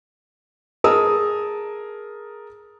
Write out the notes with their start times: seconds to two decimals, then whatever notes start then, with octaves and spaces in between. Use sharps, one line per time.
0.84 G#4 A#4 A5 D#6 E6